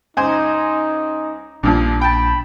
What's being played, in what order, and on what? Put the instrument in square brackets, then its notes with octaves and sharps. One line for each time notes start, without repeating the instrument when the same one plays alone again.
[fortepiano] C#2 C5 G#5 [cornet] D#4
[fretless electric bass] A#1 D4 [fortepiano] G2 A#2 F3
[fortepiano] G5 A5 [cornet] B5